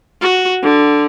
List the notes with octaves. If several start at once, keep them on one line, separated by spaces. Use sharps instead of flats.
F#4
D3